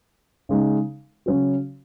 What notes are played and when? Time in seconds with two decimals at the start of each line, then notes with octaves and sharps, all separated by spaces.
0.49 C#3 G#3 D#4
1.26 C#3 F#3 C#4 F#4